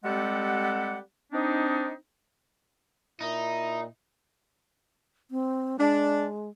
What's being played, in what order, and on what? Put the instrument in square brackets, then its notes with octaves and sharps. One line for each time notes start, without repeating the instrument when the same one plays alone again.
[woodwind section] G3 G#3 C4 G4 A4 F#5
C4 D4 D#4
[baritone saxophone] A#2 [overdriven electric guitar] D#4 [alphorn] E4
[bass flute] C4
[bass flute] G#3 [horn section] D4